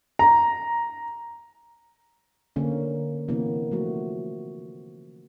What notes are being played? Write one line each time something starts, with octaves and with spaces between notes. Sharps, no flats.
A#5
D3 A#3 C#4
C3 E3 A#3 B3 C#4
F3 A3 F#4